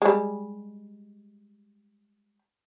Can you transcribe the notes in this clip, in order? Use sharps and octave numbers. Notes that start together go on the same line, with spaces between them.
G3 G#3